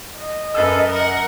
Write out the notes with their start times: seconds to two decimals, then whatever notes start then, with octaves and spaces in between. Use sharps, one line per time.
0.15 D#5
0.55 F#2 A4 B4 E6
0.90 A#4 F#5